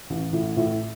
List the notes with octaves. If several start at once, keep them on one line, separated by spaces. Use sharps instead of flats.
A1
A2
A2